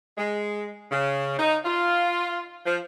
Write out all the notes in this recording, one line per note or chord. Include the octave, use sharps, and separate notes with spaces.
G#3
C#3
D#4
F4
F3